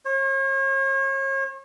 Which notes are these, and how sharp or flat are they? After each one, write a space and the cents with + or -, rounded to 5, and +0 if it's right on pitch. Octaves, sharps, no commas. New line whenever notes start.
C#5 -40